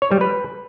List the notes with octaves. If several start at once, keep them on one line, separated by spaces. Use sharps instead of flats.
C#5
G3
B4